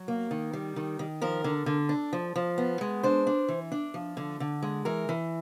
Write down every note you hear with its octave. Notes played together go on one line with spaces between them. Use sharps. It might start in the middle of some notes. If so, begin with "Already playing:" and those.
Already playing: F#3
A#3
D#3
G3
D#3
D#3
F3 A#4
D3
D3
D4
F3
F3
B3
G#3
D4 C5
D4
E3
D4
F3
D3
D3
G#3
E3 A#4
E3